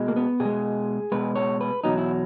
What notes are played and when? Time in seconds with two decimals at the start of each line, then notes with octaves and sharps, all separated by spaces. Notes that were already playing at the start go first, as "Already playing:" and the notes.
Already playing: B2 G#3
0.08 A#3
0.16 B3
0.40 B2 G#4
0.45 G#3
1.12 B2 G#3 B4
1.35 C#5
1.61 B4
1.84 E2 B2 F#3 D#4
1.98 E4